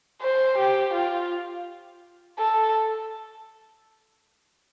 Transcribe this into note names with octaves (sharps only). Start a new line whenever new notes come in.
C5
G4
F4
A4